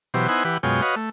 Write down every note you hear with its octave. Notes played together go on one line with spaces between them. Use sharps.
B2 E3 F#3 G4 C5
B3 D#4 E4 C5 F#5 G#5
E3 G4 B4 F#5
F#2 B2 G#3 F4 C#5 G5
F#4 B4 C#5 D#5 F5
A3